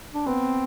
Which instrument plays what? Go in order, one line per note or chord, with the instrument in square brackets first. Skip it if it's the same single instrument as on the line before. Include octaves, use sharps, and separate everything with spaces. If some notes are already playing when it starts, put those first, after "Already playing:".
[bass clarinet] D4
[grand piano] B3 [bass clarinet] C4